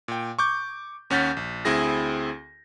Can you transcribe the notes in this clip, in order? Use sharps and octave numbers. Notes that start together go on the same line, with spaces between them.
A#2 G5
C#6 D6 G6
D#2 C#4 F#5 G6 A6 B6
A#1
D2 C4 E4 G#4 A#6